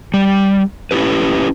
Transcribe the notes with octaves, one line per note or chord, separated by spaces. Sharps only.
G3
C#4 E4 F#4 G4 B4